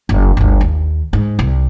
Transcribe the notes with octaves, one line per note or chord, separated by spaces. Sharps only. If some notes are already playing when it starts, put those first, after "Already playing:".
F#1
G1 D2
D#2
G#2
C2